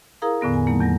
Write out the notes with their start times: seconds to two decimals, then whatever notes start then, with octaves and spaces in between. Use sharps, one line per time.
0.22 E4 G#4 A#4 F5 A#5 D#6
0.41 E2 A2 D3 B3 A#6
0.53 G#5
0.67 D#3 F#3 A3 A#3 D#4
0.80 E2 F#3 A#6